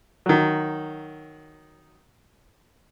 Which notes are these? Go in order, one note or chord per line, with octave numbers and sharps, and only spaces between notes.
D#3 F#3